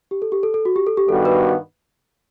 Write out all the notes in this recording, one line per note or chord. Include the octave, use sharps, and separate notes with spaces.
G4
A4
G4
A4
A4
F#4
G4
A4
G4
G2 D#3 G3 B3 F#4 A4
B4